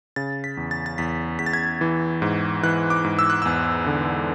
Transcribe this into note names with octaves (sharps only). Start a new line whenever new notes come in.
C#3 A6
B6
E2
A6
A6
E2 B6
E2 B6
A6
G#6
E3
G#2
E3 F#6
D6
G#2
E6
F#6
E2 E6
D3